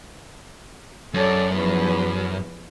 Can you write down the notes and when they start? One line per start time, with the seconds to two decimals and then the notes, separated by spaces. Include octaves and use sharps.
1.14 F#2 A4 C#5 D5
1.53 E2 F3 B4